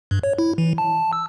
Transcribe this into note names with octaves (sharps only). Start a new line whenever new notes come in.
G2
C#5
E4
E3
A5
E6